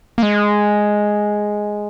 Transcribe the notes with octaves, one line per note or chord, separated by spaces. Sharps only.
A#3
G#3